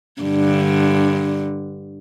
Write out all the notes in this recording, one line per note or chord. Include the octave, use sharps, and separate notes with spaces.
G2 D3